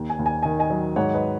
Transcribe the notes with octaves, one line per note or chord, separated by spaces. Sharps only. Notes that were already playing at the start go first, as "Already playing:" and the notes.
Already playing: D#2
G#5
D#2
G#5
D#3 G#5
D#5 G#5
F#3
G#2 C#5 F#5
B4 D#5